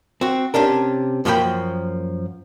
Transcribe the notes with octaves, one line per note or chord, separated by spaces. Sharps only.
C4 F#4
C3 C#4 D4 A#4
F#2 F3 A#3 C#4 G5 B5